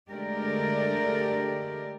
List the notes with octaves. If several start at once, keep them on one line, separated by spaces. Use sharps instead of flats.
D3 G#3 A3 G4 A#4 D5